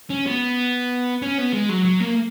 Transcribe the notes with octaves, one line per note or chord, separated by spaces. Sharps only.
C#4
B3
C#4
B3
G#3
F#3
F#3
A#3